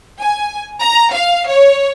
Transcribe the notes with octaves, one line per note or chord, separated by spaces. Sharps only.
G#5
A#5
F5
C#5